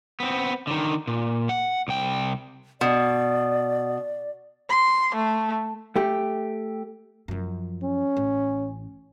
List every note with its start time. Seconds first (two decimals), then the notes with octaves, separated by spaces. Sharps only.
0.20 B3 C4
0.67 D3 D#3
1.07 A#2
1.49 F#5
1.88 C2 G5
2.81 B2 D5
4.70 C6
5.15 A3
5.96 A3 G4
7.28 F#2 F3
7.83 C#4
8.17 A1